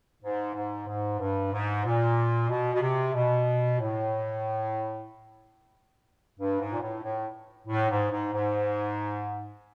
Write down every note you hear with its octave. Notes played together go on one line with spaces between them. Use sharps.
G#2
G#2
G#2
G2
G#2
A#2
B2
B2
C3
B2
A2
G2
G#2
A#2
A2
A2
A2
G#2
G#2
G#2